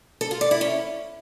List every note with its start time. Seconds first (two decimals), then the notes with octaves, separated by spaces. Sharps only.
0.21 A4
0.31 F4
0.41 D5
0.51 E4
0.61 C#4